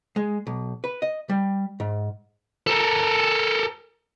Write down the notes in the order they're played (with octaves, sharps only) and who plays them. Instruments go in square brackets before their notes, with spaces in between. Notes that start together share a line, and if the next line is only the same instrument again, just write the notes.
[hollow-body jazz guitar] G#3
B1
B4
D#5
G3
G#2
[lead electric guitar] A4 A#4